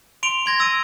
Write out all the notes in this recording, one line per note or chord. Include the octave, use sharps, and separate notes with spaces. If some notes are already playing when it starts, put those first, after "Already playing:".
C6 D7 F7 G7
C6 G#6 A#6
E6 A#6 D7 D#7